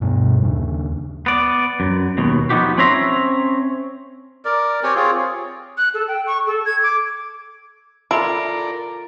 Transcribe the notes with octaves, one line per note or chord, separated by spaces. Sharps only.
G2 B2
D#2 C#3
B3 D5
F#2
D#2 B2
F3 B3 D#4 F#4 G4
C4 C#4 C#5 E5 A#5 C6
A#4 D5
C4 G4 C#5 G#5
C4 F4 G#4 C#5
F#6
A4
G5
C#6
A4
G#6
D6
E4 F4 A4 A#4 D5 A#5 D7